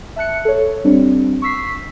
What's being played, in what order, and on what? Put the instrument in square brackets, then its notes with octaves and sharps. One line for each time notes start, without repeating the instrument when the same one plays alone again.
[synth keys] E5 A5 F#6 C#7
A4 C#5
G3 C4 D4
C#6 E6 B6 C7